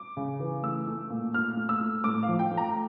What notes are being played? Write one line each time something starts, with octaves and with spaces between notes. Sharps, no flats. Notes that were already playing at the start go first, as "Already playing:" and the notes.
Already playing: D6
C#3
E3
A3 E6
A3
A#2
A#2 F6
A3
E6
A3
A2 D6
F5
F3
G5
A3
A#5